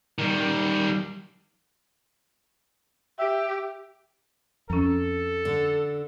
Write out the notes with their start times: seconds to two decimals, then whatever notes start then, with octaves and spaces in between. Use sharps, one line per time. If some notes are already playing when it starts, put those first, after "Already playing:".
0.19 D#3 G3
3.19 G4 E5
4.70 F2 C#4 A4 A#5
5.45 D3